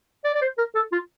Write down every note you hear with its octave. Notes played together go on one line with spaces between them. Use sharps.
D5
D5
C5
A#4
A4
F4